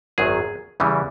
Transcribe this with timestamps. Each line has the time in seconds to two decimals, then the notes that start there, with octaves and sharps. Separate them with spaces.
0.18 G#1 F#2 D#3 F#3 G#4
0.80 E2 C#3 E3 G3